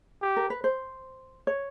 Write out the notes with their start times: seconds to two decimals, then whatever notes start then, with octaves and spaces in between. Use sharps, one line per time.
0.22 G4
0.36 A#4
0.50 B4
0.64 C5
1.47 C#5